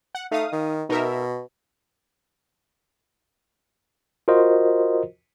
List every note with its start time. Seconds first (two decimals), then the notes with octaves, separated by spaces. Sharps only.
0.15 F#5
0.31 A3 D#4 F5 D#6
0.52 D#3
0.89 B2 D#4 A#4 E5
4.28 F4 F#4 A#4 C5 D#5